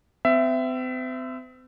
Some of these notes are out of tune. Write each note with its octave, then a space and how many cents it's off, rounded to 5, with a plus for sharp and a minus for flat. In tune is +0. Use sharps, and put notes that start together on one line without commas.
C4 -40 E5 +15